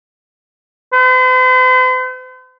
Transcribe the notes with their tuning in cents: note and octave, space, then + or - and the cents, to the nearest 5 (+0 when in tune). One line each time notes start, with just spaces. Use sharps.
C5 -45